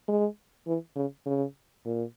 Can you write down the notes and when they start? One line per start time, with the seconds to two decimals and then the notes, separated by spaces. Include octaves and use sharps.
0.08 G#3
0.67 E3
0.96 C#3
1.26 C#3
1.86 A#2